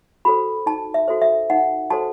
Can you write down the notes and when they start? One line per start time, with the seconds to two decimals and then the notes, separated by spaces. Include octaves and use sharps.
0.25 F#4 A4 C5 B5
0.66 D#4 A5
0.94 E5
1.08 F#4 A4 C5
1.21 E5
1.50 D#4 F#5
1.90 F#4 A4 C5 A5